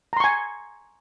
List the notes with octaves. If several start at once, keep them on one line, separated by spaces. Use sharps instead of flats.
G#5 A#5 C6 C#6